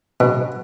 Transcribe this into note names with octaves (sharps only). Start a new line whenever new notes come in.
B2